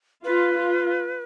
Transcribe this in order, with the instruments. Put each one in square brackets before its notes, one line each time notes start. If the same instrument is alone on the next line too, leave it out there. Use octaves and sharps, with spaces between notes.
[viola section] F4 [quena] B4
[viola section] F4